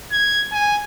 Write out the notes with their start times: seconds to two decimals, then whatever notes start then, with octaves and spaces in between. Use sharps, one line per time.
0.12 G#6
0.52 G#5